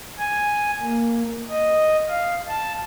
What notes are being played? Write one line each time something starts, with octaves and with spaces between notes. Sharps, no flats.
G#5
A#3
D#5
F5
A5